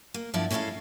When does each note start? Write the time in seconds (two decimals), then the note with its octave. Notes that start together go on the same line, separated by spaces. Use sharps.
0.14 A#3
0.34 G2 F3 B3 E4 D5
0.50 G#3 C#4 E4 G#4 A4 F5